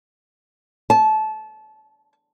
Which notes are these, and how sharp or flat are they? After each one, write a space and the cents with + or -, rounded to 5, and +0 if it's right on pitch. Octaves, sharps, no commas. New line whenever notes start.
A5 -25